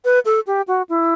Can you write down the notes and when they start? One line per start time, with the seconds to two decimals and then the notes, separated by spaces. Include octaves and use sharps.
0.05 B4
0.25 A4
0.47 G4
0.68 F#4
0.89 E4